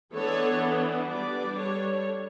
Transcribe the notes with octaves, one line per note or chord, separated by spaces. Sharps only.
E3 B3 D4 A4 C#5
G3 D4 B4 D5
A4 C#5